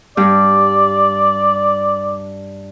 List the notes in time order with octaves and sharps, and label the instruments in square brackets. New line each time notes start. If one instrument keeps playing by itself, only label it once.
[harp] G2 [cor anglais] D5